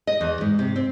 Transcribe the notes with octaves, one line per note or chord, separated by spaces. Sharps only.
D#5
E2
G#2
C3
C4